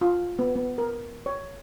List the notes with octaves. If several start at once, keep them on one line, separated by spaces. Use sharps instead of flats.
F4
B3
B3
A#4
C#5